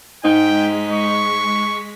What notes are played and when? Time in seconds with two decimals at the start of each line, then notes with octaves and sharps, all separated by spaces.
0.25 G#2 G#3 D#4 G5 B6
0.93 C#6